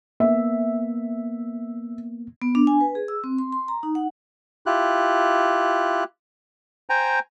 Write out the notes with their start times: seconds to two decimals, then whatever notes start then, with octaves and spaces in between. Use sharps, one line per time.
0.20 A#3 B3 E5
2.42 B3
2.55 D4
2.67 G#5
2.81 B4
2.95 G#4
3.08 E6
3.24 C4
3.38 C6
3.52 C6
3.68 A#5
3.83 D#4
3.95 F#5
4.66 E4 F4 G4 F#6
6.90 C5 G5 G#5 A#5